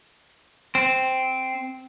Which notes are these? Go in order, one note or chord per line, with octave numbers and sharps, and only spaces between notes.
C4